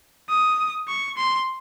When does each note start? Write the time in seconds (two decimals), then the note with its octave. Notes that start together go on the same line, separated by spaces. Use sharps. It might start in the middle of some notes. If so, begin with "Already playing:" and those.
0.29 D#6
0.88 C#6
1.17 C6